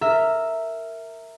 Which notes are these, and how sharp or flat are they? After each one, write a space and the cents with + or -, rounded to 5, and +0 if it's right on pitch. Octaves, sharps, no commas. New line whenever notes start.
A#4 -15 E5 -5